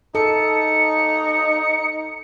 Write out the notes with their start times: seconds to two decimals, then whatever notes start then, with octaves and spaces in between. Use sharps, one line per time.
0.15 D#4 A4 C#7